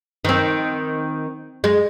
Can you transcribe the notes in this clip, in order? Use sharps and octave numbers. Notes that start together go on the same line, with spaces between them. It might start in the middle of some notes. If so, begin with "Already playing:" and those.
D#3 C4
G#3